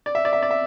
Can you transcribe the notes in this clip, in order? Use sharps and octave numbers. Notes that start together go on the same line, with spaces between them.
D5
E5
D5
E5
D5
E5